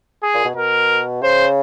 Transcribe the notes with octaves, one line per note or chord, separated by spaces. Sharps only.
G#4
A#2
B2
B2 A#4
C#3 C5